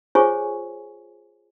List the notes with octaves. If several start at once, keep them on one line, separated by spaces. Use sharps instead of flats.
F4 G#4 C5 C#5 G#5 C#6